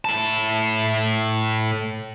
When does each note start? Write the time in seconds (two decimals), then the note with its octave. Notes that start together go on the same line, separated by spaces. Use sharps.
0.05 A2 A5